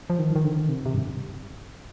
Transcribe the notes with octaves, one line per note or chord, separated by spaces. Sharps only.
F3
D#3
D#3
D3
D#3
C3
C3
G2